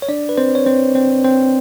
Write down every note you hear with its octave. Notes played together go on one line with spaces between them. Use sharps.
C#5
D4 D5
B4
C4 C5
C#5
C4 C5
C4 C5
C4 C5